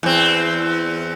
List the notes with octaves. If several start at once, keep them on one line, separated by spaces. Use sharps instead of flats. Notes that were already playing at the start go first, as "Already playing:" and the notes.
E2 C4